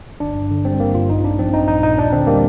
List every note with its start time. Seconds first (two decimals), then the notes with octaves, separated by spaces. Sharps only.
0.20 G1 D4
0.35 G2
0.51 D3
0.65 G3 C4
0.79 G1 A#3
0.95 G2 F4
1.09 A#1 D#4
1.24 A#2 D4
1.39 F3 C4
1.53 A#1 D#4
1.68 A#1 D#4
1.83 A#2 D#4
1.98 D#2 D4
2.12 D3 C4
2.27 G3 A#3